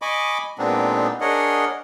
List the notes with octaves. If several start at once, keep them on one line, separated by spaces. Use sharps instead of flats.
D#5 G#5 B5 C#6 D6
A#2 G#3 B3 C4 D4 D#4
D4 G#4 A#4 C#5 D#5 F#5